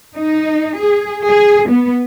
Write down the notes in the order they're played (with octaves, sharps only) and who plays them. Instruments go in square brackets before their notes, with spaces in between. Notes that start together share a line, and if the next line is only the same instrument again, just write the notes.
[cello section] D#4
G#4
G#4
B3